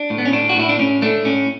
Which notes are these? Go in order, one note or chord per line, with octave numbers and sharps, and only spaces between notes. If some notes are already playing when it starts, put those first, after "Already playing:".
Already playing: D4
A2
B3
C#4
A2 D4
F#4
A2 E4
D4
A2 C#4
A3 D4
A2 C#4